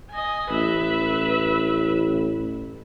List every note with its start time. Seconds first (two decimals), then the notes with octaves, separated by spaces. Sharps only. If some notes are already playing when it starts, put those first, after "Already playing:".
0.11 D#5 G#5
0.50 A1 B4 E5